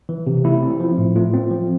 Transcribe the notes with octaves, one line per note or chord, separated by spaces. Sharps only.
E3
C3
A3 E4
C4
F3
A2
A3 F4
C4
F3